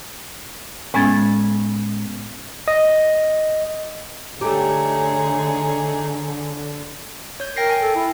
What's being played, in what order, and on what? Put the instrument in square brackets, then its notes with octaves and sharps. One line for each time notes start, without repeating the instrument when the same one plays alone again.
[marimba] A2 G#3 B3 C#4 G#6 A6
[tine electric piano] D#5
[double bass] D3 [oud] A3 G4 [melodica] D#4 [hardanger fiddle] G#4 C#5
[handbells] C#5 G6
[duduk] A#4 [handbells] G5 A#6 C7
[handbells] G5 G#5
[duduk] A4
E4